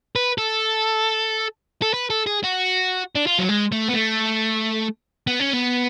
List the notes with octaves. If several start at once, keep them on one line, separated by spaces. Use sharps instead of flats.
B4
A4
A4
B4
A4
G#4
F#4
D4
F4
F#3
G#3
A3
B3
A3
B3
C#4
B3